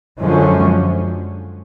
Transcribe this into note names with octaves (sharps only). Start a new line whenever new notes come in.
F#2 D3 F3 G#3 C#4